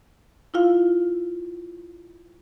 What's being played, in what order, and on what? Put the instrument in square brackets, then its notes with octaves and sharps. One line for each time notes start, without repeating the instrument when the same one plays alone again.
[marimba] E4 F4 F5